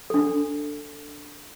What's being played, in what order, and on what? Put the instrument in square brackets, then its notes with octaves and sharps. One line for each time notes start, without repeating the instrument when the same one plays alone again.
[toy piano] D4 A4